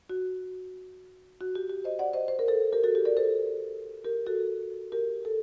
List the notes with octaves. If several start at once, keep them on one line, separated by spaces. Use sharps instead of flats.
F#4
F#4
G4
G4
C5 D#5
D5 F#5
C5 D#5
C5
A#4
A4 C5
G4 A#4
F#4 A4
G4
A#4 D5
A4 C5
G4 A#4
F#4 A4
G4 A#4
A4